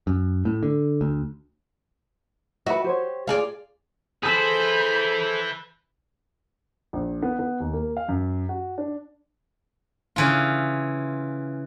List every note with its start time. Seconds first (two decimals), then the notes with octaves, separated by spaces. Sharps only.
0.07 F#2
0.45 A2
0.63 D3
1.01 D2
2.66 F#4 B4 E5
2.84 G4 C5 C#5
3.27 F4 G#4 D5 F5
4.23 G#4 A4 B4 C5 E5 B5 G6
6.93 A#1
7.23 B3
7.39 B3
7.60 D#2
7.73 A#3
7.97 F5
8.08 F#2
8.49 F#4
8.78 D4
10.16 C#3 E3 F4